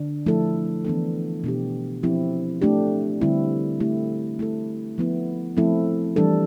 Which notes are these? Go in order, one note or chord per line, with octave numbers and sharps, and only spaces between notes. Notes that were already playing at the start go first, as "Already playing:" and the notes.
Already playing: D3 D4
F3 A3 E4 A4
E3 B3 D4 A4
B2 B3 D4 G4
F3 C4 E4 G4
A3 D4 G4
D3 G3 C4 E4
A3 E4 G4
A3 E4 A4
F3 B3 E4
F3 A3 C4 E4 A4
E3 G3 D4 A4